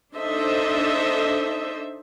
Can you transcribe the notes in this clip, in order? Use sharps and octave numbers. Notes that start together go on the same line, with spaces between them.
D4 D#4 A4 C5 D#5 E5